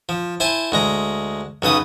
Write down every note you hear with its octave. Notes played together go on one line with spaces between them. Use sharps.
F3
E4 C5 G#5 A5
D2 G#3 A#5
B1 C#3 B4 D#6